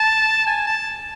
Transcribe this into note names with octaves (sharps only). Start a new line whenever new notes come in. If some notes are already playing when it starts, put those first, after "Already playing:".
Already playing: A5
G#5
A5